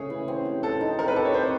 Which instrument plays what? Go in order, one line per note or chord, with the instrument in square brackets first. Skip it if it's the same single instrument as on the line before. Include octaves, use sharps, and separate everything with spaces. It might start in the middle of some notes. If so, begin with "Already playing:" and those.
Already playing: [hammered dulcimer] C#3 A3 [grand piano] G#4 C#5
[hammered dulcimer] E3
C4
G4
[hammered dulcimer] C4 [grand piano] A4
[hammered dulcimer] D#4
[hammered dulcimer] C4 [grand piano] A#4
[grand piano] B4
[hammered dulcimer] G4 [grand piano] A4
[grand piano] C#5
[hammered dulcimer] C4 [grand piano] C5